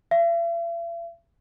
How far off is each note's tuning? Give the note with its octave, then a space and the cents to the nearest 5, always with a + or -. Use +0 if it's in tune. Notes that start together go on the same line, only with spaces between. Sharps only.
E5 +45